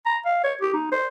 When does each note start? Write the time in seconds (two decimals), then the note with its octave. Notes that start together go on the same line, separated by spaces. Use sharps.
0.06 A#5
0.25 F5
0.44 C#5
0.61 G4
0.73 D#4
0.92 C5